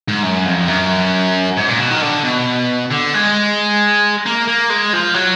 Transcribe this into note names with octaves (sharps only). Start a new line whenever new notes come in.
G#2
F#2
F2
F#2
G#2
A#2
B2
D#3
D3
B2
D3
G#3
A#3
A#3
G#3
F3
F#3